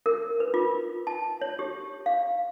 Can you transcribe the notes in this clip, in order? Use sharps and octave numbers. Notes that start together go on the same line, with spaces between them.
A#4
B4
F4
A5
C#5
G4
F5